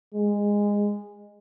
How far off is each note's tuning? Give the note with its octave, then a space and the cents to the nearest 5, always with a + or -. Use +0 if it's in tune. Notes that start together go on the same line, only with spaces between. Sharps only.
G#3 -15